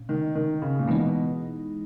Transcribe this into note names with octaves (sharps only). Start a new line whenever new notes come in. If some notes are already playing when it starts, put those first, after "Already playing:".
Already playing: A#2 C#4
D#3
D#3
C#3
A#2
B2 E3 G#3 D#4